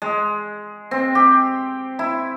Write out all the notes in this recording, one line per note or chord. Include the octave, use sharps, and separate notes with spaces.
G#3
C4
G4
E4